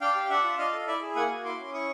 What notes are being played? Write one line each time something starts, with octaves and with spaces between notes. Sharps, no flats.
D4 F5 G5
G4
D4 E5 F#5
F4
D4 D#5 F5
A4
E4 D5 E5
G#4
A#3 F#5 G#5
F#4
E4 C6 D6
C#4
E4 C#6 D#6